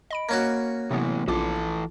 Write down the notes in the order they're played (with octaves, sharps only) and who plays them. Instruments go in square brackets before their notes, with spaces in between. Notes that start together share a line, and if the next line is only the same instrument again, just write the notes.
[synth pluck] D#5 B5 D7
[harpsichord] A#3 C#4 F#4
[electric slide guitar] A2 E3 [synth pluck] C3 F#3 B3
[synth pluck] A#1 F4 D6 [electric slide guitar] E3 A4